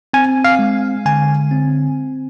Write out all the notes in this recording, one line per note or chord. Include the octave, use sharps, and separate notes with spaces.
C4 G#5
F5
G#3
D3 G#5
C4